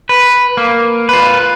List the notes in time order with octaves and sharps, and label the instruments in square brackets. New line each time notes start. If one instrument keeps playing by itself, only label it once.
[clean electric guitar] B4
A#3
F4 B4